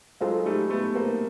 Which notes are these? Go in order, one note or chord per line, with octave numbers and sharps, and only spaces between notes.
F#3 G#3 F4 A4 C5 F5
G3 A3
A3 B3
A#3 C4